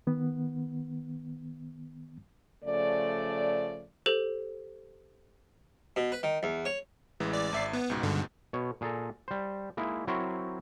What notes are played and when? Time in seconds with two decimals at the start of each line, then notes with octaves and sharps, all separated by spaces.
0.07 D#3 B3
2.65 C#3 F3 A3 D5
4.06 G4 A4 C5
5.96 B2
6.12 B4
6.23 D#3
6.43 E2
6.65 C#5
7.20 A1 E3 G#3
7.33 D5
7.53 G#1 E5 C7
7.73 B3
7.90 C#2 G#2 B2
8.03 G2 D3
8.53 B2 C#5
8.81 A#2 G#4 A4 A#5
9.28 G3 C5
9.77 G#3 A#3 D#4 E4
10.07 F#3 C4 E4 A#4 C5 C#5